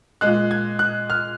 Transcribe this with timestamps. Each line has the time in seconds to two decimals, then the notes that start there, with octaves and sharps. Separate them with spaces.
0.21 A#2 G#3 F#6
0.51 G#6
0.79 F#6
1.10 F6